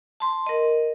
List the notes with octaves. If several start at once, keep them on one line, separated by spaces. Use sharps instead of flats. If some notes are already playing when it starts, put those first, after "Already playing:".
A5 C6
A#4 D#5